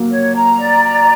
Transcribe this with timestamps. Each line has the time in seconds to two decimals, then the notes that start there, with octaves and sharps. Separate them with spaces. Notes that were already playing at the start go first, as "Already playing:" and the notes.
Already playing: F#3 A#3
0.10 C#5
0.35 A#5
0.59 D5
0.83 A#5